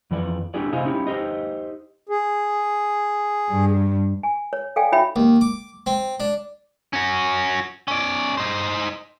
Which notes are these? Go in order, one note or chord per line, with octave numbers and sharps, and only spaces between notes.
F2 E3 D5
D4 E4 G4 G#4 D5
C3 E4 C5 D#5 F5 G#5
C#4 D#4 E4 G4
D#4 G4 C5 D#5
G#4
G2
G#5
C#5
A4 D5 F5 G5 G#5
D#4 F#4 C#5 E5 G5 B5
D#2
D6
C4
D4
C#4 F#4
C#4 D5
D#4 C5